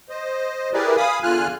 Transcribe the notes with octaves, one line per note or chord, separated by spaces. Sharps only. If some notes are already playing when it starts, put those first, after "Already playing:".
C5 D#5
E4 G4 G#4 A#4 B4 D5
F5 G#5 B5 D#6
E2 D3 F4 G#5 F6 F#6